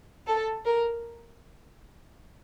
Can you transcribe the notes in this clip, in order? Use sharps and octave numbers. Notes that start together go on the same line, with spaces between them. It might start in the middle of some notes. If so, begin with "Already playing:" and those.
A4
A#4